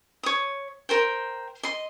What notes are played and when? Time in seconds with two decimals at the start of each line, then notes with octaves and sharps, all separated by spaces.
0.23 C#5 D#6
0.89 A#4 C5 G5
1.63 D#5 C6